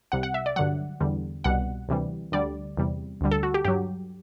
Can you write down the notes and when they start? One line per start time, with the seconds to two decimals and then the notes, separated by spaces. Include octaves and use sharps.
0.12 C2 C3 G3 F#5
0.23 F#5
0.34 E5
0.46 D5
0.56 G2 D3 F#3 F#5
1.00 E2 D3 G3
1.44 C2 B2 G3 F#5
1.89 D2 C3 E3 G3
2.32 D2 D3 G3 D5
2.77 E2 C3 G3
3.21 D2 D3 G3
3.31 A4
3.43 F#4
3.54 G4
3.64 G2 F#3 G4